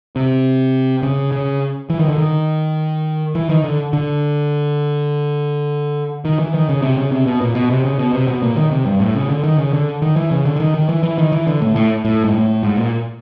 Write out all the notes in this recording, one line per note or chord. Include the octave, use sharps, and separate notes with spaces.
C3
C#3
C#3
E3
D#3
D3
D#3
E3
D#3
D3
D3
D#3
E3
D#3
C#3
C3
C#3
C3
B2
A#2
B2
C3
C#3
B2
C3
B2
A#2
D#3
C3
G2
A2
C#3
D3
D#3
C#3
D3
D#3
E3
C#3
D3
D3
D#3
D#3
E3
E3
D#3
E3
D3
A2
A2
A2
G#2
A2
G#2
A#2